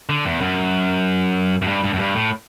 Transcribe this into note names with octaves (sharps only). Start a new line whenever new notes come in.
D3
E2
F#2
F#2
G2
G2
F#2
G2
A2